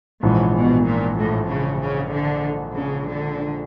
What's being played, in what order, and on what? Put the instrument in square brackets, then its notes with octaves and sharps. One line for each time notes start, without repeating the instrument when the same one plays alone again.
[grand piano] A#1 G#2 E3 [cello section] C#3
[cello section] B2
A#2
A2
C#3
C#3
D3
C#3
D3